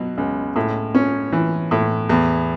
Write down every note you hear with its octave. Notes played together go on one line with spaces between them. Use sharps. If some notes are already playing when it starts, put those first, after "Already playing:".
Already playing: B2 F#3
C#2
A2
C#4
E3
A2
E2